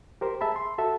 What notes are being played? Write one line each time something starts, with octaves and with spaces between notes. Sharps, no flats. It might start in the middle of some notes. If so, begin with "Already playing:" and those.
G4 A#4 C5
G#4 E5 A5 B5
C6
F#4 A4 E5 A5